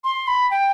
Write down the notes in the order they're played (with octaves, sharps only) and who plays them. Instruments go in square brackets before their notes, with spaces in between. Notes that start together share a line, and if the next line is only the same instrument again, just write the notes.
[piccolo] C6
B5
G5